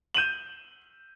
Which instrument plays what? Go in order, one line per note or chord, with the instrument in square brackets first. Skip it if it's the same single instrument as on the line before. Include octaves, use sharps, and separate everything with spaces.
[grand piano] G6 D#7 E7 F#7